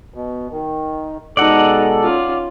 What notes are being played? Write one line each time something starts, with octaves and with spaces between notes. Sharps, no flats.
B2
D#3
B2 G#3 D#4 A4 D5 F#5
C#4 F4